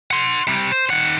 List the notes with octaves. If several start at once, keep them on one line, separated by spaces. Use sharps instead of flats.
F#5 C6
C3 G3
C5
D#3 F#5